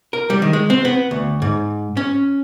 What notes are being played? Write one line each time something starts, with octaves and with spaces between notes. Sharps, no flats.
A#4
G3
D#3
G#3
C4
B3
D2
G#2
C#4